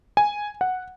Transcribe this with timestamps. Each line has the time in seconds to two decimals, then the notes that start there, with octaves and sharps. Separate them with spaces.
0.17 G#5
0.61 F#5